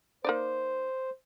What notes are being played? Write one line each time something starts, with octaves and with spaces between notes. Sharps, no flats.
A#3 D#4 C5 D5